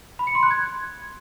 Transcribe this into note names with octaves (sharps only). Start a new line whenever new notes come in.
B5
C#7
C6
F#6
G#6